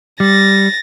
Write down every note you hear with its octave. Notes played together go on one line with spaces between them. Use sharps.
G3 A6 A#6